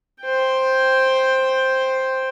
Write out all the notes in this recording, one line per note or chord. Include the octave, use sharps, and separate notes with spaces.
C5 G5